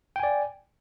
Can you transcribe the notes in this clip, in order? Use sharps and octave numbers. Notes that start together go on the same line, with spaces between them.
D5 G5 G#5